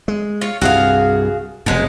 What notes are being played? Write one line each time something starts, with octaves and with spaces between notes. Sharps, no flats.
G#3
F4 C#5
C2 G2 F#4 G#4 F5
F1 F#2 B2 G#3